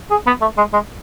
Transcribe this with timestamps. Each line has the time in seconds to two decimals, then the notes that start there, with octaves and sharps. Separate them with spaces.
0.11 G#4
0.27 B3
0.41 A3
0.57 G#3
0.73 G#3